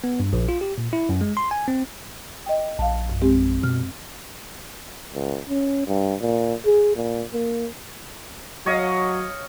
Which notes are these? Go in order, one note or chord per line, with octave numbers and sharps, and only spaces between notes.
B3
G2
A#1
F4
G4
A#2
E4
F#2
G#3
C6
G#5
C4
D#5 G5
A#1 F5 A5
F#2
G#3 C4 G4
B2 F6
C#2
C#4
G2
A#2
G#4
A#2
A#3
F#3 C#5 D#5 F5